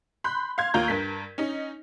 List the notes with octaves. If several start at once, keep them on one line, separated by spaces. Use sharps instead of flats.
B5 C6 F#6 G6
F5 C6 G#6
D#2 F4 A#5 G6
G2 A#4 G6 B6
C#4 D#4